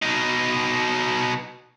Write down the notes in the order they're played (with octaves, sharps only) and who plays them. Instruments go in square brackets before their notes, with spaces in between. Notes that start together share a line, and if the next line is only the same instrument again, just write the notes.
[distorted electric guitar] B2 D#4